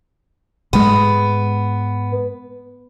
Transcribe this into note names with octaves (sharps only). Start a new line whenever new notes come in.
G#2 G#3 B3